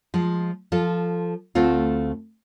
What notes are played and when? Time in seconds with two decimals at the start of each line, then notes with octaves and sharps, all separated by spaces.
0.14 F3 G#3
0.72 F3 F4 A4
1.55 D2 A3 C4 F4